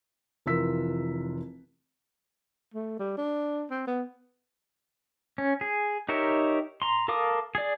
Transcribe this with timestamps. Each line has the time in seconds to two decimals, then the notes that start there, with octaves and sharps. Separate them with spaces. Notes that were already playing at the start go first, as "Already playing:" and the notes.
0.46 F1 E3 F4 A#4 E6 B6
2.74 A3
2.99 G3
3.17 D4
3.71 C4
3.87 B3
5.38 C#4
5.61 G#4
6.09 D#4 G4 A#4 C#5 E5
6.82 A#5 C6
7.08 A4 A#4 F5 D6 D#6
7.55 G#4 D5